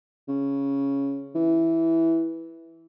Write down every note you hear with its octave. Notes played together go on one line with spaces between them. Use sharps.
C#3
E3